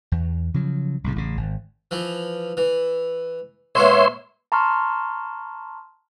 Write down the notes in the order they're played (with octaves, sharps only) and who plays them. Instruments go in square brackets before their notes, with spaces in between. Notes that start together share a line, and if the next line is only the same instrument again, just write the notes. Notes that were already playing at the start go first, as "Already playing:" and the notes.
[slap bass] E2
C#3 F3 F#3
C2 A2 C#3
A1 C#3
G#1
[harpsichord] E3 F3
E3
[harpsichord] A#2 G#3 B3 [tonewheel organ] C#5 E5 C6
[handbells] A5 A#5 C6 C#6 F6